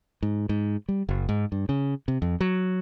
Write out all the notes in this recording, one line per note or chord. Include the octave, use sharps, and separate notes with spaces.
G#2
G#2
G3
F#1
G#2
G2
C#3
C3
F2
F#3